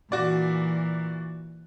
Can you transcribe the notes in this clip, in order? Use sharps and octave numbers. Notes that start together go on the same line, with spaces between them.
A#2 E3 F#4 D5